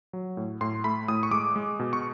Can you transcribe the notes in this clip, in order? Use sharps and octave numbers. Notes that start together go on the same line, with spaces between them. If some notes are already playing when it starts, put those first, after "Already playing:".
F#3
A2
A2 C6
A3 B5
A2 D#6
C#6
G#3 D6
G#3
B2
C#6